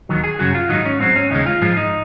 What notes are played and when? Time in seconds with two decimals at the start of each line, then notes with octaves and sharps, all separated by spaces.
0.09 D#2 D#3 F#3
0.24 G#4
0.39 F#2 C#3 F#3 F#4
0.55 F4
0.69 G#2 D#3 F#3 D#4
0.85 C#4
1.00 G#2 F#3 C4
1.16 C#4
1.31 D#2 C#3 G#3 D#4
1.46 F4
1.61 G#2 F3 G#3
1.77 D#4